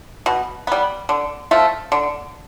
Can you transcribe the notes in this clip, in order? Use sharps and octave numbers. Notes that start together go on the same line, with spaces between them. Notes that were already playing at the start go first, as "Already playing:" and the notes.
B2
G3 B3
D3
F3 A3
D3